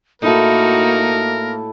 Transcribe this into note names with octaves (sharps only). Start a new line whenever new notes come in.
A2 A#3 D#4 E4 F#4 A4 A#4